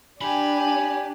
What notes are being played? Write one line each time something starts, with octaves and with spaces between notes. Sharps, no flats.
D4 G4 G#5 B5